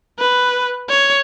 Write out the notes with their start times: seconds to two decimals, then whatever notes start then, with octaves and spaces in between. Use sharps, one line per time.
0.18 B4
0.89 C#5